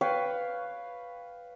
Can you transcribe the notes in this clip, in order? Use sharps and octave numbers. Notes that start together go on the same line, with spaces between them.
B4 C#5 F5 G5